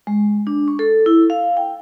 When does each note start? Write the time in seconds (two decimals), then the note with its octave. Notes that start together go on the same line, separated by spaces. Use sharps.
0.07 G#3
0.47 D4
0.68 C#6
0.79 A4
1.06 E4
1.30 F5
1.57 G5